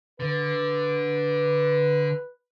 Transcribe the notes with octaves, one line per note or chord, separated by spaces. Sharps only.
D3 B4